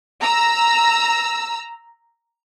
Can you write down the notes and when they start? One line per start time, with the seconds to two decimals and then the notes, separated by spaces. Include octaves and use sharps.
0.22 A#5 E6